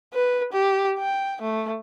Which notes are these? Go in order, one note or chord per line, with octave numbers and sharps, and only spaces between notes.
B4
G4
G5
A3